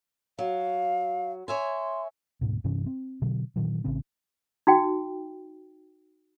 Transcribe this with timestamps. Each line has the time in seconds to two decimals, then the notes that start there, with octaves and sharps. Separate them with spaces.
0.39 F#3 F5
1.48 C#5 E5 G#5 C6
2.41 D2 G#2 B2
2.64 G2 C3 E3 C#4
2.86 C4
3.22 B2 D3 F#3
3.56 A#2 D#3 E3 F#3
3.84 A1 C#3 C4
4.67 D#4 F#4 G5